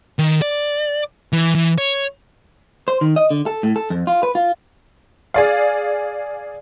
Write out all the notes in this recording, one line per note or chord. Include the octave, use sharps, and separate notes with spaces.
D#3
D5
E3
E3
C#5
C5
D#3
D#5
D3
A4
A2
A4
F2
F4
B4
F4
G#4 D5 F5